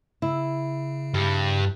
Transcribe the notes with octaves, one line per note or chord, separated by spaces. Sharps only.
C#3 E4
G2